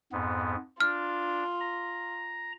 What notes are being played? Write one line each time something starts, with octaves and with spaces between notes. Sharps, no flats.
F2 G#2 B3
D4 F4 F6
A#5